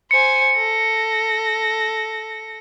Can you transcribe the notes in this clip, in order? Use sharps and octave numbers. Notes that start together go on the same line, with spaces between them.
C5 G#5 C#7
A4 A#6